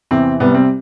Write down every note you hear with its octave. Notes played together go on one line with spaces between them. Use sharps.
E2 C3 E3 C4
C2 C3 G3 B3
C4